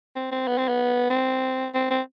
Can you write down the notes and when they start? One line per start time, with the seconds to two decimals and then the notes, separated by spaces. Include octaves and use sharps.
0.16 C4
0.32 C4
0.48 B3
0.58 C4
0.69 B3
1.10 C4
1.74 C4
1.91 C4